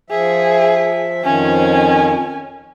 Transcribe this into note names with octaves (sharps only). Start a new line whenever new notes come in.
F3 G#4 E5
F2 D#3 F3 C#4 G#5